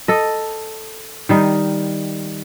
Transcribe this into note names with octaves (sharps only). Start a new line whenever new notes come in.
A4 D#5
D#3 G3 D#4